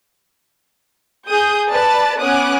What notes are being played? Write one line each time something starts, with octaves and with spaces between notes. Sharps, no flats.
G#4 D#6 G6
B4 D5 A5 B5 A6
B3 C#4 G#5 D6 D#6 F#6